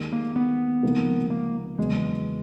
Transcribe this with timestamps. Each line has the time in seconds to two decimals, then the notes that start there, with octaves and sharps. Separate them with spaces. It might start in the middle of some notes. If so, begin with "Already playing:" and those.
Already playing: D#2 D#3 G#3
0.12 A#3
0.36 B3
0.83 C#2 C3 F3 A#3 D#4
1.30 A#3
1.78 E2 C#3 F#3 G#3